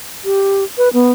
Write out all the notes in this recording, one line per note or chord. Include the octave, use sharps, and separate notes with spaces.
G4
B4
B3